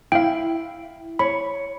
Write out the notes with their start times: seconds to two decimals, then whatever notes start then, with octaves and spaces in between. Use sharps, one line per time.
0.12 E4 F5 G5
1.19 C#5 B5